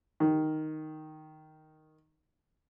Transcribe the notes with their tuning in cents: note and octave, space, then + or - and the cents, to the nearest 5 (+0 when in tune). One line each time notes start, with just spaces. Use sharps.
D#3 +0